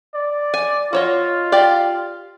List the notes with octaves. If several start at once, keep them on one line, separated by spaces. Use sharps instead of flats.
D5
G#5
F4 F#4 C#5 D#5
G4 D5 F5